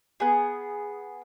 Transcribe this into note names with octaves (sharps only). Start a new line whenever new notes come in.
B3 G#4